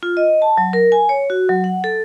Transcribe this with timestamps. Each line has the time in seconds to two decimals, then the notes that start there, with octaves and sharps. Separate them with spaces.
0.03 F4
0.17 D#5
0.42 A5
0.57 F#3
0.73 A#4
0.92 G#5
1.09 C#5
1.30 F#4
1.49 F#3
1.64 F#5
1.84 A4